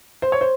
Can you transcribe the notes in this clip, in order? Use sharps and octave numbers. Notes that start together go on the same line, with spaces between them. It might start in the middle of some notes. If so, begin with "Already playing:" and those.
C5
C#5
C5